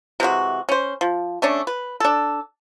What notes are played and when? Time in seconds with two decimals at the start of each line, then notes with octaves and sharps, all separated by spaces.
0.20 C3 E3 G#3 F#4
0.69 C#4 C5
1.01 F3
1.42 A3 C#4 D4
1.67 B4
2.00 D4 A4